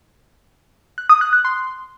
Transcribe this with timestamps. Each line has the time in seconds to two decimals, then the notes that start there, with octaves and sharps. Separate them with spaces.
0.98 F#6
1.09 D#6
1.21 F#6
1.33 F#6
1.45 C6